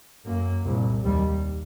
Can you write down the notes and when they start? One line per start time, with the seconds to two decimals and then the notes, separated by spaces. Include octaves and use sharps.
0.25 F#2 A#3
0.65 C2 A#2
1.04 D#2 G3